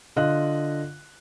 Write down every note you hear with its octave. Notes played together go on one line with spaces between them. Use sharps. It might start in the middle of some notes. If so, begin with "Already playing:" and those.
D3 F4 D#5 F5 F#6